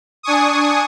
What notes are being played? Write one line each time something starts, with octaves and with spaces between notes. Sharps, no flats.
D4 G#5 C#6 D#6